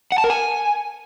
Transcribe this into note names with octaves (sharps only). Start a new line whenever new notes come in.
F#5
A5
A#4
G#5